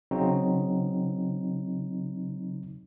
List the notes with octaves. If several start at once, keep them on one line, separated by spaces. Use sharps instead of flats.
C#3 F#3 C4 D#4